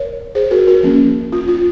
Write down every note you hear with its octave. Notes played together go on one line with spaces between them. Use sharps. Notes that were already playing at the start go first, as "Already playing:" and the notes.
Already playing: A#4 C#5
G#4 C5
F#4 A#4
F#4 A#4
F3 A#3 C#4
F4
F4